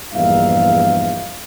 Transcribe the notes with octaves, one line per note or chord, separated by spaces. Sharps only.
A#1 E2 G2 D#4 E5 F5